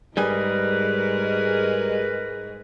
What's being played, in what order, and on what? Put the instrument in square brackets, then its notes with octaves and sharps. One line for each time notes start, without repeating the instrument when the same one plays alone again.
[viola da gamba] G#2 G#3 [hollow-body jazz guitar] G3 G#4 [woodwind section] A#4 B4